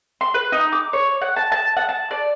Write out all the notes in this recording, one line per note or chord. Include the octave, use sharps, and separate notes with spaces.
C6
B4
D#4
D6
C#5
F#5
A5
A5
F#5
A5
D5